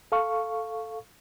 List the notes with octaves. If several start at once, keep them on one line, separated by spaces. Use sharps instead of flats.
A4 F5 C#6